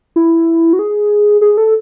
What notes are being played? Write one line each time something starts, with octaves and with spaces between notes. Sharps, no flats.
E4
F#4
G#4
G#4
A4